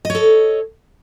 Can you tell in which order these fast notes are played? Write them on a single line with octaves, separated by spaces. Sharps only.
D#5 C#5 A4